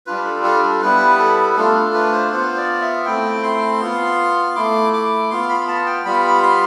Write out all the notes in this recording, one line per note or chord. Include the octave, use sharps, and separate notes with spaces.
G3 D4 F4 B4
A4
A4
A4
G3 B3 E4 B4
A4
A3 D4 F4 A4
A4
B4
C5
B3 F4 C5
D5
E5
A3 C4 E4 G5
C6
B3 F4
A3 E4 D6
D6
B3 F4 C6
B5
A5
G5
G3 B3 F4 B5
C6